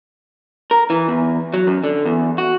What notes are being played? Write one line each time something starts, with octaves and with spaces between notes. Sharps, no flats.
A#4
E3
E2
F#3
F#2
D3
E2
F#4